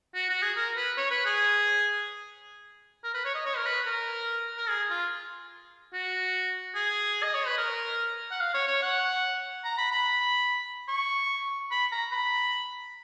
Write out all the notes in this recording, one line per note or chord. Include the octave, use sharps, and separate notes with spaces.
F#4
F#4
G#4
A#4
B4
C#5
B4
G#4
A#4
B4
C#5
D#5
C#5
A#4
B4
A#4
A#4
G#4
F4
F#4
G#4
D#5
C#5
B4
A#4
F#5
F5
C#5
C#5
F#5
A#5
B5
B5
C#6
B5
A#5
B5